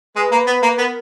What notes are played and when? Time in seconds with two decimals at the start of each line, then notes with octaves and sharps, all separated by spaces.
0.16 G#3 B4
0.31 A#3
0.47 B3
0.63 A#3
0.78 B3 A#4